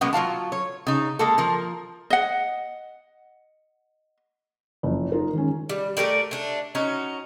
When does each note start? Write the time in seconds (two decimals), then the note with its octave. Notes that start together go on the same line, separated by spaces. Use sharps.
0.01 B2 F#3 G#3 A#3 B3 C#4
0.13 F#3 F4 F5 A5
0.52 C#5
0.87 C#3 D#4
1.19 G#3 A#3 A4
1.38 F3 A#4
2.10 D#5 F#5
4.83 F#1 F2
5.12 D#4 F4 A#4
5.33 D#3 G#3 C#4
5.69 G3
5.97 A3 G4 A#4 D5
6.31 A3 D4
6.75 C#4 D#4 F#4